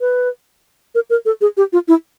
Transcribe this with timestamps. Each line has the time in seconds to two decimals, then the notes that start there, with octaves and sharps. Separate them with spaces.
0.01 B4
0.95 A#4
1.10 A#4
1.25 A4
1.41 G#4
1.57 G4
1.73 F4
1.88 E4